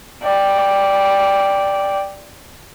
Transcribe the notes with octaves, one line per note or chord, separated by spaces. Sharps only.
D5 G5